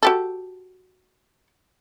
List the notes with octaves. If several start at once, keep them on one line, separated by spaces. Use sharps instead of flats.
F#4 G4 A4